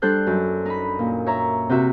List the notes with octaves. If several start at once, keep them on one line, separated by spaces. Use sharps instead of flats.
G3 D4 A4 C5 F#6 G6
F#2
D#4 B5
A#2
C#5 E5 A#5
C3 C4 F#4 E5